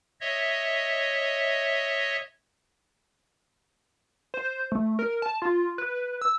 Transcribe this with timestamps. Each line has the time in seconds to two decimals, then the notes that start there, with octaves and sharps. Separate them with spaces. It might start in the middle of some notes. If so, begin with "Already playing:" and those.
0.21 C#5 D#5 E5
4.34 C5
4.72 A3
4.99 A#4
5.22 A5
5.42 F4
5.78 B4
6.22 E6